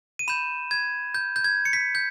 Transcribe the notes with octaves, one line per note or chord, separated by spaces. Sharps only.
D#7
B5 G6 E7
G#6
G6
G6
G#6
C#7
B6
G6